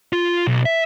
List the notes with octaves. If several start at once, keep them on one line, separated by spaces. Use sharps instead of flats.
F4
B1
E5